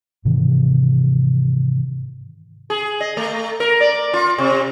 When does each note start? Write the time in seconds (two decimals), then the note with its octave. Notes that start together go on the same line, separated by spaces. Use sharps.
0.25 G#2 C3 D#3 E3
2.70 G#4
3.01 D#5
3.17 A3
3.60 A#4
3.81 D5
4.14 F4
4.38 C3